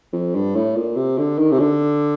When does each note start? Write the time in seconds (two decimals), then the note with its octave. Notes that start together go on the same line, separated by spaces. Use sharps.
0.13 F2
0.35 G2
0.56 A2
0.76 A#2
0.97 C3
1.19 D3
1.39 D#3
1.52 C3
1.60 D3